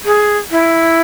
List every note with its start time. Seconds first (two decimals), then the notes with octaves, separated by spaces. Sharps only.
0.05 G#4
0.51 E4